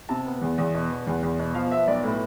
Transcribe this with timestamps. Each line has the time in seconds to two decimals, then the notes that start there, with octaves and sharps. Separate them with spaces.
0.09 C3 A5
0.26 B3
0.41 E2
0.58 E2
0.74 B2
0.90 B3
1.07 E2
1.23 E2
1.39 B2
1.54 F3 F5
1.71 B3 E5
1.87 B1 D5
2.03 A2 B4